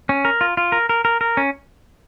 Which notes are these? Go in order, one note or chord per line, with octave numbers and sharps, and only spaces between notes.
C#4
A#4
F4
F4
A#4
A#4
A#4
A#4
C#4